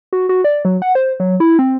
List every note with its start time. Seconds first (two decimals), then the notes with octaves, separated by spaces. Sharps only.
0.13 F#4
0.29 F#4
0.44 D5
0.65 F#3
0.82 F#5
0.95 C5
1.20 F#3
1.40 E4
1.59 C4